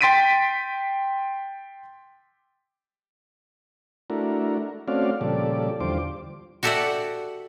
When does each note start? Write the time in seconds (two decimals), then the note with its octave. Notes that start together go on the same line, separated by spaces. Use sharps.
0.01 G5 C6 A6 B6 D7 D#7
4.10 A3 D4 E4 F#4 A#4
4.88 A3 C4 C#4 F#4 D5 F5
5.21 A#2 C#3 F3 G3 A4 D5
5.80 E2 D3 G3 F4 C5 D6
6.63 F#4 G4 A4 D5 E5 F#5